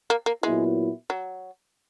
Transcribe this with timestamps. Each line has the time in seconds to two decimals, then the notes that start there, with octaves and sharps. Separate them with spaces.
0.10 A#3
0.26 A#3
0.43 A#2 F#3 G#3 B3 E4
1.10 F#3